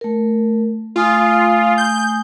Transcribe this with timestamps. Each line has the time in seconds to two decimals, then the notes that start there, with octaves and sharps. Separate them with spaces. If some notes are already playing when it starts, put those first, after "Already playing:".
0.01 A3 A#4
0.96 A3 F4 G#5 D#6
1.78 G6